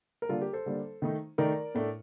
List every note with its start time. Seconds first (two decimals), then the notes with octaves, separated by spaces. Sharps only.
0.22 A#4
0.29 D3 G3 A#3 D4 F4 A4
0.41 G4 A#4
0.53 A4 C5
0.66 D3 G3 A#3 D4
1.02 D#3 A3 D#4
1.38 D#3 A3 D#4 A#4 D5
1.75 A2 A3 D4